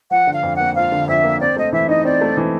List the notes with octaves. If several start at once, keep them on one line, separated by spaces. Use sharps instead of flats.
F3 F#5
D3
F5
F2
F#5
A#3
F3 F5
D3
F2 E5
A#3
C4 D5
A3 D#5
E3 E5
D#4 D#5
C4 D5
A3
E3